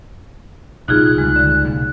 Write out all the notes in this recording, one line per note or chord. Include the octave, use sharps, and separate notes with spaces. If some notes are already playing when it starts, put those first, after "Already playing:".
A#1 C3 G3 D#4 F4 G#4 F#6
C#2 G3 G#3
D3
C2 A#2